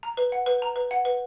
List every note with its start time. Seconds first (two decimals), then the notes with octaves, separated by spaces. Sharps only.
0.03 A#5
0.17 B4
0.32 F#5
0.46 B4
0.62 A#5
0.76 B4
0.91 F#5
1.05 B4